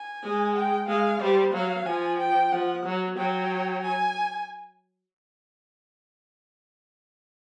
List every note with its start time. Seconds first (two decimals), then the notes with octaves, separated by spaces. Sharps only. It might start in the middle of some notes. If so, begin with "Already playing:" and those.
Already playing: G#5
0.23 G#3
0.55 G5
0.88 G#3 F5
1.21 G3 C5
1.53 F#3 F5
1.86 F3 G#5
2.19 G5
2.52 F3 F#5
2.85 F#3
3.17 F#3 G5
3.83 G#5